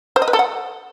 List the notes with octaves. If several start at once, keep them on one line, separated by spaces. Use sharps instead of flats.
C5
D#5
B4
A4
F#5